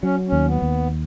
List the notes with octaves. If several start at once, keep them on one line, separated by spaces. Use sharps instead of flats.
F#3 C#4
D#2 C#4
B3
D#2